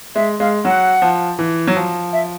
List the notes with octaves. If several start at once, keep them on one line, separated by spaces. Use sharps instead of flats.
G#3 E5
G#3 F5
F#3 F#5
F3
E3
F#3
F3
E5